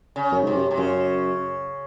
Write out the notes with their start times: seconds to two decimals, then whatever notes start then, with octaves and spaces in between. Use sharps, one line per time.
0.16 C#3
0.32 F#2
0.43 G#2 C3
0.55 F#2
0.71 C3
0.77 F#2 C#3